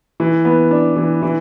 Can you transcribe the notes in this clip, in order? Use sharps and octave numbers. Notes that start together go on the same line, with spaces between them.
E3
B3
D4
E3
E3